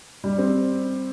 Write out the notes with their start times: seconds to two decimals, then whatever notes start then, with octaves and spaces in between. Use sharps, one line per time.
0.24 G3
0.38 C4